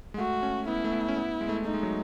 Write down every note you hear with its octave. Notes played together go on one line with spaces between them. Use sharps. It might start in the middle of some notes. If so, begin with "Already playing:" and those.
G#3
A3 F#4
C#4
B3 E4
A3
B3
C#4
B3
G#3
A3
A3 D#4
G#3
F#3